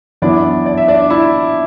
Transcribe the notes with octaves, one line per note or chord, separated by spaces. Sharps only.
F#2 E3 B3 D4 E4 D5
D5
E5
D4 D5
E4 E5